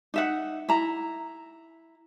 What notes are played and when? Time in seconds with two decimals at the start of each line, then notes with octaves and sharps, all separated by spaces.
0.14 D#4 E5 F#5
0.69 E4 A#5